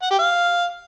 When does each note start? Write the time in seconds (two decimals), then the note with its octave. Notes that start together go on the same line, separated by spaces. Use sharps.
0.02 F#5
0.11 G4
0.19 F5